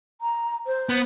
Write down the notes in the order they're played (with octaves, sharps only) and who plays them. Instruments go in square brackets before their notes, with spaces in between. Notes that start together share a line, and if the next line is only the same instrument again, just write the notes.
[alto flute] A#5
C5
[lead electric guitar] B3